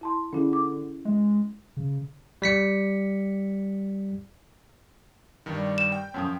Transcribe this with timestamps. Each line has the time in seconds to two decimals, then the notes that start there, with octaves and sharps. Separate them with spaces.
0.01 E4 A5 C6
0.33 D3 C#4 E4 G#4
0.53 D6
1.05 G#3
1.77 C#3
2.42 G3 B6 C#7
5.46 G2 D#3 G3
5.78 E7
5.92 G5
6.14 F#2 F3 D#6